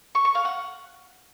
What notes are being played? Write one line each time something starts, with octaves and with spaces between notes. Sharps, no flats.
C#6
C#6
F5
F#5